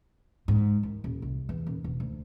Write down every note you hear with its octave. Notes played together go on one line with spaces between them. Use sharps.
G#2
D#2
D#1
C2
E2
D#1
E1
D2